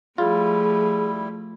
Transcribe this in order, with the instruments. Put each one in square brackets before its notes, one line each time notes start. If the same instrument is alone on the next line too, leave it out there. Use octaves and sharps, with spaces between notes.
[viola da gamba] F3 A3 [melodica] G3 E4 [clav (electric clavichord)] F4 [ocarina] G#4